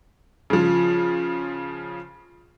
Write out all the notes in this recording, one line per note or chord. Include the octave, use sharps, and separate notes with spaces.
C#3 F3